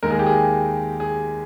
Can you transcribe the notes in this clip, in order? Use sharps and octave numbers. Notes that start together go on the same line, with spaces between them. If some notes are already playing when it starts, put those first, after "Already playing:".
D#2 D#3 G#3 A#4
G#4
G4
G#4
G#4